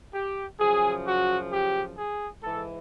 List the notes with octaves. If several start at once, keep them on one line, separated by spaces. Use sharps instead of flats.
G4
F#2 C#3 F3 G#4
F#4
G4
G#4
G#2 E3 A4